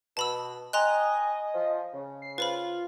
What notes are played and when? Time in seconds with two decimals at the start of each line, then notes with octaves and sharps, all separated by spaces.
0.17 B2 A5 B5 E6
0.73 D#5 G5 G#5 A#5 C6 F#6
1.54 F3
1.93 C#3
2.22 C7
2.38 F4 B4 C5 B5